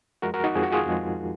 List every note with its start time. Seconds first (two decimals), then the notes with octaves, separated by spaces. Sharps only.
0.22 F2 F3 G#3 F#4 A#4
0.34 F#4 A#4
0.44 D#4 F#4
0.55 F2 F3 G#3 G#4
0.63 F#4
0.72 F4 G#4
0.86 F2 F3 G#3